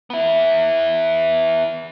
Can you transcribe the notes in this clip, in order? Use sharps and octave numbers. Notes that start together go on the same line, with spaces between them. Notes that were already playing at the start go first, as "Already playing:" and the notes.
B3 E4